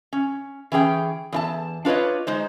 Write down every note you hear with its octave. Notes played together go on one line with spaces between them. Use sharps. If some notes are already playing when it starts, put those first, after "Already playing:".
C#4
E3 C#4 G#4 G5
E2 E4 A5
D4 F4 B4 C#5 D#5
G#3 D#4 C5